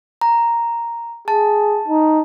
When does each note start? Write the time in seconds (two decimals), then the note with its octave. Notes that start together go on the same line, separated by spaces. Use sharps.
0.21 A#5
1.28 G#4 A5
1.88 D#4